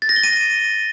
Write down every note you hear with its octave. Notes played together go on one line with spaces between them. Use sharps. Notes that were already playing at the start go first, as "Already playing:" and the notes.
A6
A#6
G7
D#7